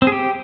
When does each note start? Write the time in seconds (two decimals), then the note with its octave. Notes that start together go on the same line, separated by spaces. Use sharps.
0.02 C4
0.07 G#4
0.12 G4